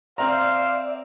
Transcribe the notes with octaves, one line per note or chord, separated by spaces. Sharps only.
C4 C5 D5 E5 F5 A#5